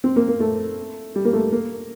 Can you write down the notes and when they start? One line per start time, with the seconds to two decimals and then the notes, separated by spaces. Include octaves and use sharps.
0.04 C4
0.16 A#3
0.28 A#3
0.40 A3
1.16 G3
1.25 A#3
1.33 A3
1.52 A#3